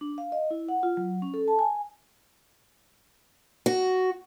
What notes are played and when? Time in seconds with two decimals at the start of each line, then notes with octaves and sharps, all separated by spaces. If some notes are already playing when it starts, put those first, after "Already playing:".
0.01 D4
0.18 F5
0.32 D#5
0.51 E4
0.69 F#5
0.83 F4
0.97 F#3
1.22 C#4
1.34 A4
1.48 A5
1.59 G#5
3.66 F#4